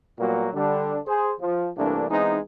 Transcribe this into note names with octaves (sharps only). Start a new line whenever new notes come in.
A#2 F#3 G3 A#3 B3 F#4
D3 G3 D4
G#4 C5
F3
C2 E3 A3 A#3 D4
E3 G#3 B3 C4 D#4